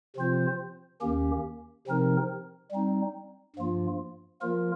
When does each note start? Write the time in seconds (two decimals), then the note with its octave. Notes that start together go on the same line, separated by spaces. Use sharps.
0.16 C3 F3 C4 F4 C5
1.01 D#2 D#3 A#3 C#4 G4
1.87 C3 F3 C4 D#4 A#4
2.71 G3 C4 D#4
3.56 G2 F3 A#3 F4
4.42 F3 A#3 F4 A#4